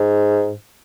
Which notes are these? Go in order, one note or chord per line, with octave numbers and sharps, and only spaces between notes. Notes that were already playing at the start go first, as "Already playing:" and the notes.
Already playing: G#2